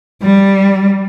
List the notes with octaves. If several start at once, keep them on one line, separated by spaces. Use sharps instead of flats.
G3